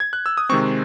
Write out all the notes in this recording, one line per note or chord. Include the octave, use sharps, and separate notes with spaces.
G#6
F#6
E6
D#6
C3 D#3 G#3 C4 C#6